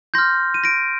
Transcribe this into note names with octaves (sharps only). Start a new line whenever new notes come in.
C6 F6 G6 A#6
D#7
A#6 D7